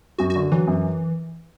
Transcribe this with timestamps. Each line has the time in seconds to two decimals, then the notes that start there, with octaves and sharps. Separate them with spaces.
0.18 F#2 F#4
0.30 F#4
0.36 D3
0.52 E3 F#3
0.68 F#2